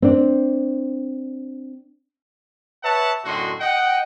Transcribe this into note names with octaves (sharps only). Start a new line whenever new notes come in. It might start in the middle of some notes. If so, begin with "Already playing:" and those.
C4 D4
B4 C#5 E5 F#5 A5
F#2 A2 D3 F#4 D#5 C6
D#5 F#5 G5